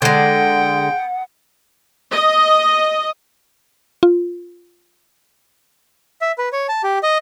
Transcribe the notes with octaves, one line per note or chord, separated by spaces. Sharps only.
D3 G#3 F#5 G5
D#5
F4
E5
B4
C#5
A5
G4
D#5